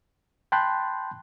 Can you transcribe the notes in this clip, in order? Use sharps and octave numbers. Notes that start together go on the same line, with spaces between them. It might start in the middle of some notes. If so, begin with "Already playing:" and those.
G5 A5 B5 C6 F#6 G6